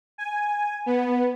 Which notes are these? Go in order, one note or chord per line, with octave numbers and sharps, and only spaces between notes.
G#5
B3